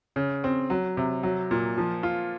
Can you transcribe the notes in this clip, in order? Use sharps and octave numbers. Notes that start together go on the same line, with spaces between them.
C#3
C4
F#3
C3
F#3
A#2
F3
F4